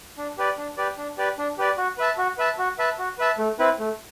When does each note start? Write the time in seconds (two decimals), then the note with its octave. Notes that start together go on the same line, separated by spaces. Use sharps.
0.17 D4
0.38 G4 B4 D5
0.58 D4
0.77 G4 B4 D5
0.98 D4
1.18 G4 B4 D5
1.38 D4
1.58 G4 B4 D5
1.78 F#4
1.98 B4 E5 A5
2.18 F#4
2.38 B4 E5 A5
2.58 F#4
2.79 B4 E5 A5
2.98 F#4
3.18 B4 E5 A5
3.38 A3
3.59 C4 E4 B4
3.79 A3